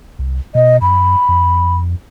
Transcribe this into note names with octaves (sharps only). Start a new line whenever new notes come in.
C2
B2 D#5
F#2 B5
F2